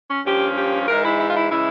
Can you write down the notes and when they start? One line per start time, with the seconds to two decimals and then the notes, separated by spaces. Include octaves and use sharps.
0.09 C#4
0.25 G2 F3 A#3 C#4 G4
0.57 G4
0.87 G#2 E3 G#3 A#4
1.03 E4
1.18 E4
1.29 F4
1.35 E4
1.50 C#3 E3 G#3 E4